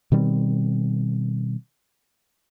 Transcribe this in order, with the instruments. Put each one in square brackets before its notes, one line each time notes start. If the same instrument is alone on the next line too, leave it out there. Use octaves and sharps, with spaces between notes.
[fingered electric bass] B2 D#3 G3 C4